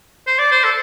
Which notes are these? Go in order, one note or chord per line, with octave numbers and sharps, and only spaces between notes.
C5
D5
C5
A4